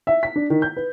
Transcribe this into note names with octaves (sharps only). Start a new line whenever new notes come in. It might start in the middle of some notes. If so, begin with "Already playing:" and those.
E5
B6
D4
D#3
G6
B4